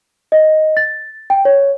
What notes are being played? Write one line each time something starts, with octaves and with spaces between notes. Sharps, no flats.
D#5
A6
G5
C#5